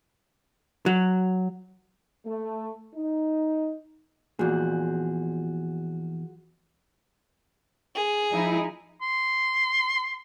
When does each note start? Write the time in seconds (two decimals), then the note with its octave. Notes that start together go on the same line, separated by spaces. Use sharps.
0.86 F#3
2.26 A3
2.95 D#4
4.39 E2 A#2 F3 F#4 G#4
7.95 G#4
8.31 F3 D#4 E4
9.02 C6